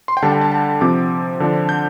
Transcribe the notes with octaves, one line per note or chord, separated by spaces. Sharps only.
C6
G5
D3 G3 D4 A5
G5
A5
A5
C3 F3 C4 D6
D3 F3 D4
G6